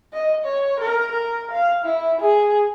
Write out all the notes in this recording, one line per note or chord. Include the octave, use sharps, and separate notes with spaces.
D#5
C#5
A#4
A#4
F5
E4
G#4